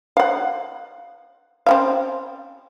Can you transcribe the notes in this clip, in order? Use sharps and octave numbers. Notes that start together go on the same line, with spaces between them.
F5 F#5
C4 C#4 F5